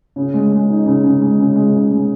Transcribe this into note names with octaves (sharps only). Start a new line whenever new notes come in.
C#3
G#3
G#3
D#4
C#3
C#3
G#3
C#3
G#3
C#3
G#3